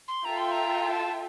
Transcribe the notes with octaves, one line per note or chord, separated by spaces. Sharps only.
C6
F4 A4 E5 G5 A#5
C6
A#5
A5